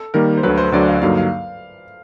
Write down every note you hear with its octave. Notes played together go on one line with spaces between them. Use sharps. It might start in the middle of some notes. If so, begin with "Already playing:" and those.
Already playing: A4
D#3 G3 A#3 A#4
C5
D2 D3 F#3 B4
C5
D2 D3 F#3 D5
F5
G2 D3 F#3 A#3 D#4 F5
F5